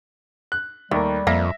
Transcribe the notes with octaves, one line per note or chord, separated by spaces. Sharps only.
F#6
D#2 G3 A3 A#4
F2 A#3 E5 A#5 A#6